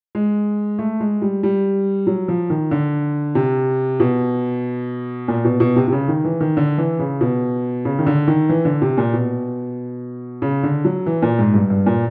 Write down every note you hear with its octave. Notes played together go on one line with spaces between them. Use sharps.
G#3
A3
G#3
G3
G3
F#3
F3
D#3
D3
C3
B2
A#2
B2
B2
C3
C3
C#3
D#3
E3
D#3
D3
E3
C#3
B2
C#3
D#3
D3
D#3
E3
D3
C3
A#2
B2
C#3
D3
F#3
E3
A#2
G#2
G2
G2
A#2